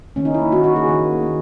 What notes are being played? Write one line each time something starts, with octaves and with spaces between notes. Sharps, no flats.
D#3 A#3 C#4
D#4
E4
D#3 A#3 F#4
F#4
G#4
D#3 A#3
D#3 A#3